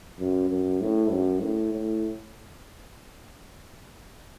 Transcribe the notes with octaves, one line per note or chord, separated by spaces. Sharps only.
F#2
F#2
A2
F#2
A2
A2